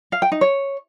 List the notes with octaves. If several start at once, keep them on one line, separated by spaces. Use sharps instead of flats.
F5
G5
D#4
C#5